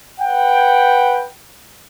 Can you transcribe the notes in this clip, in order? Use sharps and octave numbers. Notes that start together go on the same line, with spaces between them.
B4 F#5 G5